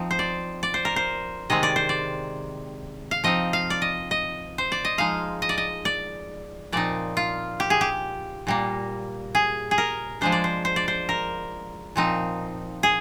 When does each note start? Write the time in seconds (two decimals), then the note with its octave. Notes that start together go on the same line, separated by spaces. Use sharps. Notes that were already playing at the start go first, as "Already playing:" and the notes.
Already playing: F3 C4 D#4
0.11 C5
0.19 D5
0.63 D5
0.74 C5
0.85 A#4
0.96 C5
1.50 C3 D#3 G#3 C4 D#5
1.63 D5
1.76 C5
1.89 D5
3.11 F5
3.24 F3 C4 D#4 D#5
3.53 F5
3.70 D5
3.82 D#5
4.11 D#5
4.58 C5
4.72 D5
4.85 D#5
4.98 F3 G#3 D#4 F5
5.42 D#5
5.49 D5
5.58 D#5
5.85 D5
6.72 A#2 F3 C4 D#4 D5
7.17 F4
7.60 G4
7.70 G#4
7.81 G4
8.47 A#2 G3 A#3
9.35 G#4
9.71 G#4
9.78 A#4
10.21 F3 G#3 D4 C5
10.32 D5
10.44 C5
10.65 C5
10.76 D5
10.88 C5
11.09 A#4
11.96 A#2 F3 C4 D#4
12.83 G#4